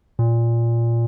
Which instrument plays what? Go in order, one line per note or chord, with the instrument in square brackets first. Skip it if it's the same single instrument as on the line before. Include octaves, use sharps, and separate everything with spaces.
[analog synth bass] A#2